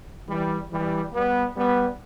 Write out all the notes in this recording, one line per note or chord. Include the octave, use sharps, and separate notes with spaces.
E3 G3
E3 G3
G3 B3
G3 B3